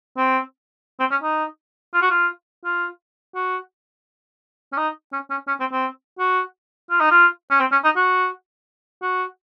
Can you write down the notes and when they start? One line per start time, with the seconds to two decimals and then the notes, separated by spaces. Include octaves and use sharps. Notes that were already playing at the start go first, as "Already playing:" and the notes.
0.17 C4
1.00 C4
1.11 C#4
1.23 D#4
1.94 F4
2.02 F#4
2.10 F4
2.65 F4
3.35 F#4
4.72 C#4
4.77 D#4
5.13 C#4
5.30 C#4
5.48 C#4
5.60 C4
5.72 C4
6.19 F#4
6.90 F4
7.00 D#4
7.11 F4
7.51 C#4
7.60 C4
7.72 C#4
7.84 D#4
7.96 F#4
9.02 F#4